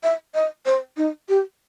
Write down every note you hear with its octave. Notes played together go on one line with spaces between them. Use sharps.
E5
D#5
C5
D#4
G4